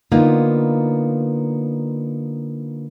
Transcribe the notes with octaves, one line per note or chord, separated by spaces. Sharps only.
D3 A#3 B3 D#4 F4